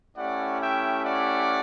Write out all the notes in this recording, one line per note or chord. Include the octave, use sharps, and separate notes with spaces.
A3 C#4 E4 G4 D5 F#5
E5 G5
D5 F#5